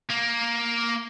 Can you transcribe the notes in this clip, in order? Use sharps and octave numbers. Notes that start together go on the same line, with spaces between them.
A#3